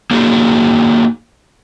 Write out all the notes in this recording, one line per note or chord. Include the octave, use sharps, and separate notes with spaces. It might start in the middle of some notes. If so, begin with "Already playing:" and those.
A#3 D#4 F#4 G#4